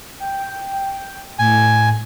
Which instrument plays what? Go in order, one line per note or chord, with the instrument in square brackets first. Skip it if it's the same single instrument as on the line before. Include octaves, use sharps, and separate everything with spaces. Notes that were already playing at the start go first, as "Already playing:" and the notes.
[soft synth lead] G5
[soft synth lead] A2 [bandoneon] G#5